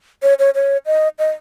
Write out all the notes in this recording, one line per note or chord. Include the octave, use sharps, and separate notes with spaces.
C#5
C#5
C#5
D#5
D#5